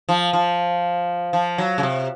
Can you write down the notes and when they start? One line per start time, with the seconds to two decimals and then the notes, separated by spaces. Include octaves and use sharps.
0.09 F3
0.33 F3
1.33 F3
1.58 F#3
1.78 C#3
1.83 C3